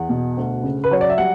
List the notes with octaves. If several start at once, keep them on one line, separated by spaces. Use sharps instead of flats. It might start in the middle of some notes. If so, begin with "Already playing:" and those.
Already playing: E2 F#5
B2
D2
C#3
B4
F#3 C#5
D5
E5
G3 F#5